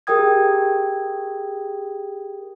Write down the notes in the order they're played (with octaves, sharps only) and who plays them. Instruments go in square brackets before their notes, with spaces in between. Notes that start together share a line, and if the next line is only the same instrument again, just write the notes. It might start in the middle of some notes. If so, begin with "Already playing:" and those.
[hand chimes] G4 G#4 A#4 G5 D#6 G#6